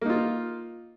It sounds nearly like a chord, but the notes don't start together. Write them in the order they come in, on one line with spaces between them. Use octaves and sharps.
A#3 D#4 F4